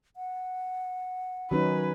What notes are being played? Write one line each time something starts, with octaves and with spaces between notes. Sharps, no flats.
F#5
D#3 F#3 C#4 D#4 B4